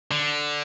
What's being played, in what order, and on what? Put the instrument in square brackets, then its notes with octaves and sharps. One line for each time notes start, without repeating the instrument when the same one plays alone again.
[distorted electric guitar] D3